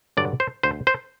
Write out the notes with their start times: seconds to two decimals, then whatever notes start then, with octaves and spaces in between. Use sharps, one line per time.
0.17 G2 D3 F#3 D5
0.40 C5
0.63 D2 C5
0.87 C5